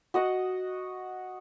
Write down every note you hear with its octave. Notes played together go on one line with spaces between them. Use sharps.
F#4 D#5 F#5